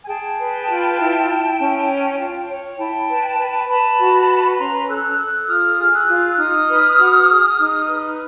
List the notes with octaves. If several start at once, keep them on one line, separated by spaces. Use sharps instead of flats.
G#5
G#4 G5 A5
B4
F4
E4
E4
C#4
C#5
F4
C#5
E4 G5 A5
B4
B4
B4 A5 B5
F#4
B4
C#4 A#5 C6
A4 E6 F#6
A4 E6 F#6
F4 D#6 F6
G#4
E6 F#6
F4
D#4 D#6 F6
B4
F#4
G#4
D#4
B4